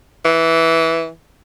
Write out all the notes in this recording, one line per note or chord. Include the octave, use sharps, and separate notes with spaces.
E3